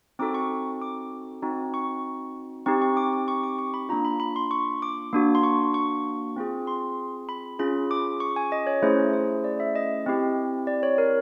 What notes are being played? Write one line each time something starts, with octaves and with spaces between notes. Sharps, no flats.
C4 D#4 F#4 A4 D6
C#6
D6
C4 D#4 F#4
C#6
C4 D#4 G4 C#6
C#6
D6
D6
C#6
D6
C#6
B5
A#3 D4 F4 A#5
B5
B5
C6
C#6
D6
A#3 D4 F#4
C6
C#6
C#6
C4 F4 G#4
C6
B5
C#4 F4 G#4 B5
D6
C#6
G#5
D#5
C#5
A3 C#4 E4 G#4 C5
C5
D5
E5
D#5
C4 E4 G4
D5
C#5
A#4